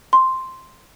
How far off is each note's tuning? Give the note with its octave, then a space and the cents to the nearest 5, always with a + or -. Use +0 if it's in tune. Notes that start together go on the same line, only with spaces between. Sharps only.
C6 +0